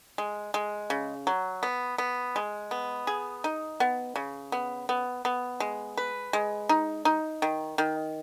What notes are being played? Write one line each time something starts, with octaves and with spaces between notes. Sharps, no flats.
G#3
G#3
C#3
F#3
B3
B3
G#3
B3
G#4
D#4
B3
C#3
B3
B3
B3
G#3
B4
G#3
D#4
D#4
D#3
D#3